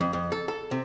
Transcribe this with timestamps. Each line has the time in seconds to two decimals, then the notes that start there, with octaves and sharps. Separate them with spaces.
0.01 F2
0.13 F2
0.32 A4
0.48 A4
0.71 C3